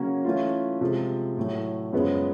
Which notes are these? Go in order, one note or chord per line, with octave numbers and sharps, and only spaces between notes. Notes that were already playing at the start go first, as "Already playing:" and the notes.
Already playing: C#3 F#3 A#3 C#4 F#4
E3 A3 C#4 F4
C3 F3 G#3
A2 F#3 A3
F#2 C#3 F3 G#3 B3